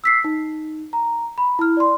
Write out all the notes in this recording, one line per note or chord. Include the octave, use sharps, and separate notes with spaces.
E6 B6 C7
D#4
A#5
B5
E4 F6
D5 C6